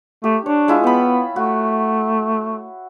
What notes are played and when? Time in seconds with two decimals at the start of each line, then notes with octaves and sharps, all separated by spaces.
0.24 A3 G4
0.46 D4 C#5
0.68 G#3 E4 F4
0.84 B3 G5 B5
1.36 A3 F#4